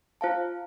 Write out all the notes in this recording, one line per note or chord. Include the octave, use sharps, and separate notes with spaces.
F4 C5 F5 A5